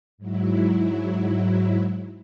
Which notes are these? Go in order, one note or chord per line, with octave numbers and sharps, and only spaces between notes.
G#2 F#3 E4